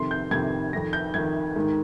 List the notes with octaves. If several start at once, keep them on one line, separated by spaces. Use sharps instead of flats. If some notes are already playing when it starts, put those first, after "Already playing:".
Already playing: F2 C3 D#3 C6
G6
F2 C3 D#3 G#6
F2 D#3 A#6
G6
F2 D#3 G#6
G#2 D#3